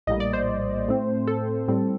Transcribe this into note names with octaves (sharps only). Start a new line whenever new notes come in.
A#1 A2 G3 A#3 D#5
D5
C5
A2 A3 C4
A4
A2 G3 C4